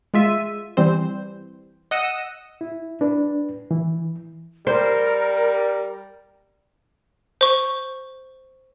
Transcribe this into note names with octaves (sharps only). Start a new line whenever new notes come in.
G#3 F4 E5 D#7
E3 G3 C4 C5
D#5 F#5 D#6 E6
E4
D4 B4
E3
G3 A#4 C5
C5 C#6